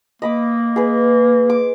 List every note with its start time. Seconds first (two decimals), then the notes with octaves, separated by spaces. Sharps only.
0.22 A#3 D#5 B5 D6
0.76 G#4 B4
1.50 D6